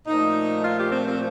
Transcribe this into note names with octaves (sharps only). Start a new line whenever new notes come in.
A#2 F3 A3 D#4
F4
G4
C4
C4